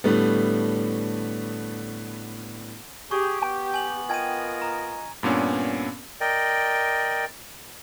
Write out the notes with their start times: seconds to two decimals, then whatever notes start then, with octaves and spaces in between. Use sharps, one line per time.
0.04 A2 D3 G3 A3 B3
3.11 G4 G#4 C#6
3.42 B3 G5
3.74 G#5 F#7
4.10 F4 A#4 D#5 G5 G#6 D#7
4.62 A#5
5.23 G2 A#2 B3 C#4 D4
6.21 A#4 D5 D#5 G5